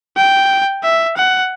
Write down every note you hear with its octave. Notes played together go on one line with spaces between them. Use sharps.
G5
E5
F#5